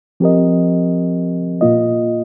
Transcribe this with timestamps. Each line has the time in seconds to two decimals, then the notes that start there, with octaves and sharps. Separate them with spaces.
0.20 F3 C4 G4 A#4 D#5
1.61 A#2 A#3 F4 D#5